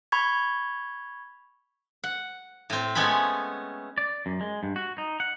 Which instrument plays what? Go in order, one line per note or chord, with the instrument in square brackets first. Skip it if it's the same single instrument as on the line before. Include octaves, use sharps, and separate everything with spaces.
[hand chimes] B5 C#6 G#6
[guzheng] F#5
A2 C4
G#3 A3 B3 C#4 B5
[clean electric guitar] D5
F#2
G#3
G2
F#4
D#4
F#5